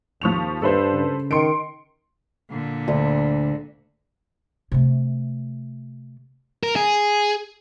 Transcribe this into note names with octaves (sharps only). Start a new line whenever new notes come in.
D#2 F3 C#6 F7
G2 A4 B4 C5
C#3
D#3 C6 C#7 D7
A#2 D3
D2
C3 A3
A#4
G#4